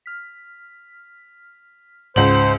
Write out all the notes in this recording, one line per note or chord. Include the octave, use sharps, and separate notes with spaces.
F6 B6
C#2 G#2 C5 F#5 G6 F#7